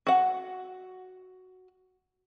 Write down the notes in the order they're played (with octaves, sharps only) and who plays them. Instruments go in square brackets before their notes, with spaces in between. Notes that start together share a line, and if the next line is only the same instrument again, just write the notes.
[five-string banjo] F#4 F#5